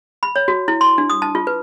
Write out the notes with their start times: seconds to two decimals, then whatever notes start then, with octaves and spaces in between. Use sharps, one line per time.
0.23 B5
0.36 C#5
0.48 F#4
0.68 E4
0.81 C6
0.98 D4
1.10 D#6
1.22 A5
1.35 F4
1.47 B4